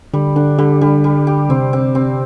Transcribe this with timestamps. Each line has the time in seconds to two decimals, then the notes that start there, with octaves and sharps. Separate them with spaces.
0.14 D3 G3
0.36 D3 D4
0.59 D3 G3
0.81 D3 G3
1.04 G3
1.27 G4
1.49 C3 C4
1.73 C4
1.95 C4